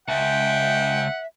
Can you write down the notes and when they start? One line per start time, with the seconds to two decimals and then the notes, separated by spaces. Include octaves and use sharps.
0.08 C#2 E5 F#5 G5